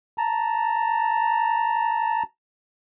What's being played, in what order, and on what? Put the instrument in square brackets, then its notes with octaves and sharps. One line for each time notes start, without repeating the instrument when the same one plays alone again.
[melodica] A5 A#5